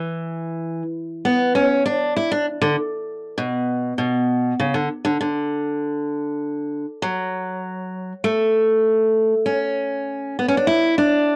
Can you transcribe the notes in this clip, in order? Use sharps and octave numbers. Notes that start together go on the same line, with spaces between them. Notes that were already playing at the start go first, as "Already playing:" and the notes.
Already playing: E3
B3
C#4
D4
E4
D4
D3
B2
B2
C#3
D3
D3
D3
F#3
A3
C#4
B3
C#4
D4
E4
D4